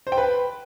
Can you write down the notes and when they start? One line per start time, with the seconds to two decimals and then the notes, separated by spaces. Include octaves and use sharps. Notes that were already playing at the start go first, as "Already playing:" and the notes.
0.07 C5
0.12 G5
0.18 B4